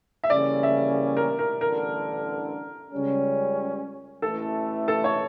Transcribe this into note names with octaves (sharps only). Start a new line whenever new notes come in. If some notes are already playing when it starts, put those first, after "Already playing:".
E5
C#3 E3 G3 A#3 C#4 D5
E5
A#4
A#4
A1 G2 D3 A#4
C#2 C#3 G3 C#4
A1 A2 E3 A3 A4
A4
C#5